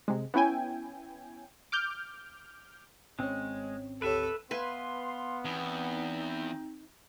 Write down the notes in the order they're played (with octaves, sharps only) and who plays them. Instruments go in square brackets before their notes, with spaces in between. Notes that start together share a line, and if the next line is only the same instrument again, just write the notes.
[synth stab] C3 G#3
B3 C#4 E4 G5 G#5
D6 F6 G6
[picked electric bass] G#1 C4 [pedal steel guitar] G#3 [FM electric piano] C#4 C#5
[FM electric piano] D2 G4 C#5 [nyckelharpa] A4 [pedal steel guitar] B4 E5
[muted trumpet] B3 [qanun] B4 E5 G#5 [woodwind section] F5 C6
[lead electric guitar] E2 [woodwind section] C4 D#4